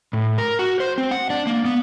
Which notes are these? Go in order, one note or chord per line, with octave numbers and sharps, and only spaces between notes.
A2
A#4
F#4
C5
C4
F#5
D4
A#3
B3